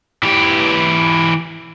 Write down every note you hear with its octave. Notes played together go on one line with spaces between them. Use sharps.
E3 G4